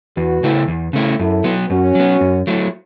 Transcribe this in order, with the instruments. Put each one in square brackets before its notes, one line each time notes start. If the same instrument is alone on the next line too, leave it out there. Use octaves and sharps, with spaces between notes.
[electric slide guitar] E2 [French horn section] F#4 B4
[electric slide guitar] C#3 A3 E4
E2
C#3 A3 E4
[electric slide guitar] F#2 [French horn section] E4 A4
[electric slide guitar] F#3 B3
[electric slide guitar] F#2 [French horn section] C#4 F#4
[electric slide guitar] F#3 B3
F#2
F#3 A3 E4